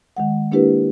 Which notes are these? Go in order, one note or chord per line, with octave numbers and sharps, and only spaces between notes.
D#3 G#3 F#5
A#3 D4 E4 G4 A#4 B4